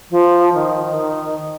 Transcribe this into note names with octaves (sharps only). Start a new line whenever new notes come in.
F3
D#3
D#3